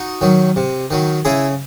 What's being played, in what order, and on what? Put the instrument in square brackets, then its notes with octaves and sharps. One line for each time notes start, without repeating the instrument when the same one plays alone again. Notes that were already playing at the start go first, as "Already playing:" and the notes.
Already playing: [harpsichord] D#4 F#4
D#3 F#3
C3
D#3 F#3
C#3 E4 G#4